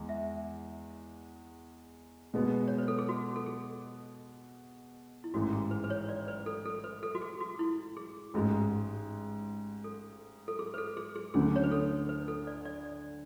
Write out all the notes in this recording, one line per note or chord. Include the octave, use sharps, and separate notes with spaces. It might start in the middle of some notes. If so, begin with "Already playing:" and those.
Already playing: E2 G#3
E5
B2 G#3 B3
C#5
B4
A4
G#4
F#4
A4
G#4
E4
A1 G#2 E3 F#4
G#4
B4
B4
C#5
D5
B4
A4
A4
B4
A4
F#4
G#4
F#4
E4
G#4
A1 G#2 G#3
A4
A4
G#4
B4
A4
G#4
G#4
D2 D3 F#3 A3 G#4
C#5
B4
A4
B4
A4
D5
D5